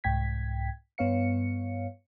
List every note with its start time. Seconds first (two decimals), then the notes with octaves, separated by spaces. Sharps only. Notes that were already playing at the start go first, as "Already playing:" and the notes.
0.04 C2 G#2 G5 G#6 B6
0.98 G2 B3 C#5 F5 C#7